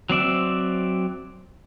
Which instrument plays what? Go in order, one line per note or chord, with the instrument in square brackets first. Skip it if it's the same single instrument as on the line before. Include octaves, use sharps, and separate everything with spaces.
[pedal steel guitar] F#3 C4 D5 E5